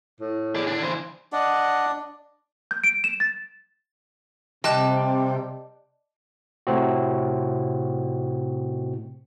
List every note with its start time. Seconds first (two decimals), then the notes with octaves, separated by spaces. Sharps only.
0.21 A2
0.55 G#4 D5
0.67 D3 D4
0.83 E3 C5
1.33 D4 D#5 F#5
2.71 G6
2.84 D7
3.04 E7
3.20 A6
4.64 C3 G3 D#5 A5 F#6
6.67 A2 C3 C4 F#4